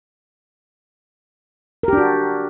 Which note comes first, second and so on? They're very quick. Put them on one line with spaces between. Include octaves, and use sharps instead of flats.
A#4 G4 D4 F#4